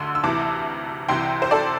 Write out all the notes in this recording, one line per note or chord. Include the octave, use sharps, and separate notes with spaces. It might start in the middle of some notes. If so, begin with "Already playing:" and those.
Already playing: D2 D3 C6 E6
E6
D2 C3 E3 A5 D6
C2 C3 E3 G5 C6
C5
A4 D5